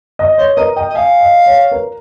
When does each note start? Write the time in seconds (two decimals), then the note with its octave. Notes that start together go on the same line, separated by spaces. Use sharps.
0.19 D#5
0.38 C5 C#5
0.57 A#4 D#5
0.76 D#5 G5
0.90 D#5
0.95 F5 G#5
1.21 D#5
1.46 C#5
1.71 A#4